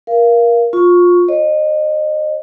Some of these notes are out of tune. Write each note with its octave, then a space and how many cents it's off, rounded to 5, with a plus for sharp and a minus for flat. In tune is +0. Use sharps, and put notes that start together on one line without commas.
A#4 +20 F5 -25
F4 +20 C#6 +0
C5 +45 D#5 -25